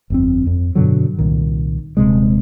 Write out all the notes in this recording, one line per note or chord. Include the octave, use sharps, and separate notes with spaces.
G1 F2 C4
F2
G2 B2 D3 F#3
C2 A#2 D#3
D#1 C3 G#3